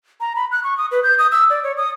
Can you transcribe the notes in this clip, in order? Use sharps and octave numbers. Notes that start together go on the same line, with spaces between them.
A#5
B5
F#6
C#6
D#6
B4
G6
D#6
E6
D5
C#5
D#6